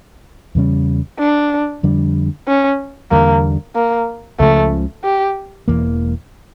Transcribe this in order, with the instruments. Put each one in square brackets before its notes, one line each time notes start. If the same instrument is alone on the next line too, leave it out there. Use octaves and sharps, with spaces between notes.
[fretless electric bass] E2 C#3 G3 C#4
[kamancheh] D4
[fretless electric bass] F2 D3 G3 D4
[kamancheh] C#4
[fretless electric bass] E2 D3 G3 [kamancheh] A#3
[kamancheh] A#3
[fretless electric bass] C#2 C#3 F3 [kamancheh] A3
[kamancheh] G4
[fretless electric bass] E1 E2 E3 A#3